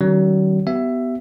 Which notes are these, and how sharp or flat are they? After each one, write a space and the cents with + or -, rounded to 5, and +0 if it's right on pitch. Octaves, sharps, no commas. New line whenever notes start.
D#3 -25 F#3 +40 C#4 -10
B3 +10 G4 -35 E5 +15